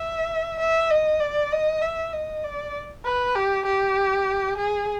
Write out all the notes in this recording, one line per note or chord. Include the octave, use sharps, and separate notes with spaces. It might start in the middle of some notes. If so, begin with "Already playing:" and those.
Already playing: E5
E5
D#5
D5
D#5
E5
D#5
D5
B4
G4
G4
G#4